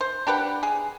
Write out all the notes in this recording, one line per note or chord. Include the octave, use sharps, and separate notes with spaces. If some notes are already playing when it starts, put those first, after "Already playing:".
C5
D4 G4 B4 F#5
G#4